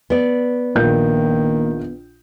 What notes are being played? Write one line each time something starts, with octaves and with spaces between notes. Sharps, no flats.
B3 D5
A#1 D#3 A#3 A#4 G6